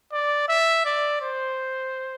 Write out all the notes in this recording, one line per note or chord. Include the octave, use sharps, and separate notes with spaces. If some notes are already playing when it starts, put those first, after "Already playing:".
D5
E5
D5
C5